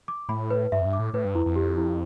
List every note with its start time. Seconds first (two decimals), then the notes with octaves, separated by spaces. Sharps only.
0.08 D6
0.29 A2 B5
0.50 B4
0.72 G2 E5
0.81 F2
0.85 G2
0.93 D6
0.99 A2
1.14 A2 B4
1.25 G2
1.35 F2 E4
1.46 F2
1.56 G4
1.77 E4